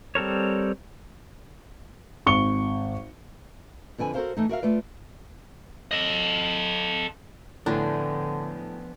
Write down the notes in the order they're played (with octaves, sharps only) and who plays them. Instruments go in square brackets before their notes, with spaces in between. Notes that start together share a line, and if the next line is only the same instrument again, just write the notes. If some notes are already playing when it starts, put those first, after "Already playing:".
[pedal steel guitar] G3 C4 A4 A#4 C#5
[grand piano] G#1 C#6 C#7 G7
[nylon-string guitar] F2 D3 B4 G#5
F#4 G4 A4 A#4 C5 F5
E3 A3 D#4
F#4 A#4 E5 F5
A3 F4 B4 D5
[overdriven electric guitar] A4 D#5
[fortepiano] A2 [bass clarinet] D3 [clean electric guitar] F3 B3 G#4 [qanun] D4